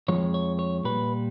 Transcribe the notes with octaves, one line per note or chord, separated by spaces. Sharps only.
F2 D3 F3 G#3 C#5
C#5
C#5
A#2 G3 B4